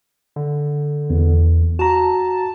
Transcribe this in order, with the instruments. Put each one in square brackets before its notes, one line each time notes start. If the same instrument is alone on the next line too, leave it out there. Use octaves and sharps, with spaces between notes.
[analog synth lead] D3
[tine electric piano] E2
[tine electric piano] F#4 A#5 [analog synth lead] A5